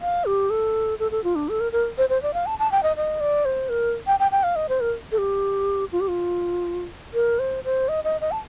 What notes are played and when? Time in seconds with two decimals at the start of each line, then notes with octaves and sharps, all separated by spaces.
0.01 F5
0.25 G4
0.50 A4
0.99 A4
1.11 A4
1.24 F4
1.35 D4
1.49 A4
1.60 A#4
1.72 A#4
1.98 C5
2.09 C5
2.23 D5
2.34 F5
2.46 A5
2.59 A5
2.72 G5
2.83 D#5
2.97 D#5
3.21 D5
3.45 C5
3.69 A#4
4.07 G5
4.20 G5
4.32 G5
4.43 F5
4.56 D#5
4.69 C5
4.81 A#4
5.12 A4
5.18 G4
5.92 F4
6.01 G4
6.08 F4
7.14 A#4
7.39 C5
7.64 C5
7.89 D#5
8.04 D#5
8.21 D#5
8.32 A5